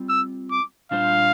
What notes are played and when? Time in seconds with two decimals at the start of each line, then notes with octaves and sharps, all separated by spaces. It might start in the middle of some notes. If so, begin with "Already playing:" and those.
Already playing: G3 C4 F4
0.09 E6
0.51 D6
0.91 A#2 G3 D4 F4 C5 F5